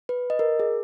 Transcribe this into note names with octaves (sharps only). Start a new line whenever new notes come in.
B4
D#5
A#4
G#4